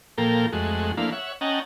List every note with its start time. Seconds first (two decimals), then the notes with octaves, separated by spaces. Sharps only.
0.18 A#2 F3 A#3 A4 A#4 G5
0.53 F2 G#3 A3 F#4
0.97 F3 A3 A#3 D4 E4 F5
1.12 C#5 E5 F#5
1.41 C#4 D#5 F#5 G5 A5 A#5